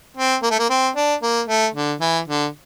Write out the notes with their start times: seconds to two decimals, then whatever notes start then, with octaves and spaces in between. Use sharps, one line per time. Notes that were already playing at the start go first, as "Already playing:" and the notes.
0.17 C4
0.43 A#3
0.51 A3
0.59 A#3
0.70 C4
0.96 D4
1.23 A#3
1.48 A3
1.75 D3
2.01 E3
2.28 D3